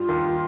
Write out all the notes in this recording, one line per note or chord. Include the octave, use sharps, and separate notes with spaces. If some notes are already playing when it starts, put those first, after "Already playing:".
Already playing: G2 G3 F4
D#2 D#3